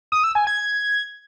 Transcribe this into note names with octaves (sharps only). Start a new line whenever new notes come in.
D#6
E6
G#5
G#6